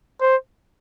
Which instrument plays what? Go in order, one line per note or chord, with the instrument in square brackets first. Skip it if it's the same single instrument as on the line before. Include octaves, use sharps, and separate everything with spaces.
[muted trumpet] C5